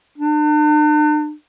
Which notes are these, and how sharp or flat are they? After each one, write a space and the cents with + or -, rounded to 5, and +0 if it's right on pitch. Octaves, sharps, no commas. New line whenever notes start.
D4 +40